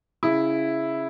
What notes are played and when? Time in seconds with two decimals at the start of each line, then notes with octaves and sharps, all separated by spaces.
0.23 C#3 E4